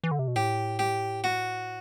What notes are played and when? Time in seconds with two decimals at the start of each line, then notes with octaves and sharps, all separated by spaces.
0.04 E3
0.11 D3
0.19 C3
0.28 B2
0.36 A2 G4
0.79 G4
1.24 F#4